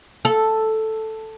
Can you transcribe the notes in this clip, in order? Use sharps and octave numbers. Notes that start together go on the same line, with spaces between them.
A4